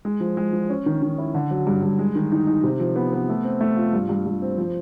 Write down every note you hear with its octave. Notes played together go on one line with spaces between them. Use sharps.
G#3
F3
G#3
F3
C#4
D#3
D#3
E4
D3
F#3
G2
G2
G#3
D#3
D#4
D#4
C3
F3
B3
B3
A3
C4
A3
F4
G2
G2
G2
C4
F3